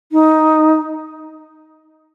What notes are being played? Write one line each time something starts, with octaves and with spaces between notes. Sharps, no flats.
D#4